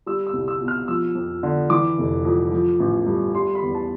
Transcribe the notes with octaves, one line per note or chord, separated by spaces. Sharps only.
G3 E6
E6
C2
E6
B2
F6
F3 E6
F2
D3
E3 D6
F1
F2
F3
A1
G2
G3 C6
B5
E2
A5